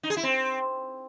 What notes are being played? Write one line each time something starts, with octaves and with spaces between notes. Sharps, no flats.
D#4
G#4
E4
C4